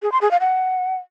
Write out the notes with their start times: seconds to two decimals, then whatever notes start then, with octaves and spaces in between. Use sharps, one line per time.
0.02 G#4
0.12 C6
0.21 G#4
0.31 F5
0.40 F#5